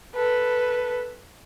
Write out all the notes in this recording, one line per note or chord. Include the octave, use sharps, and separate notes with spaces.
A4 B4